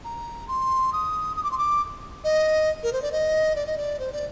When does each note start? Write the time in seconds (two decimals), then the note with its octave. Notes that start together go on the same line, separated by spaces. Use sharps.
0.04 A#5
0.48 C6
0.93 D#6
1.36 D#6
1.43 D6
1.51 C6
1.58 D6
2.24 D#5
2.83 A#4
2.93 C5
3.02 D5
3.12 D#5
3.55 D5
3.66 D#5
3.77 D5
3.99 C5
4.12 D5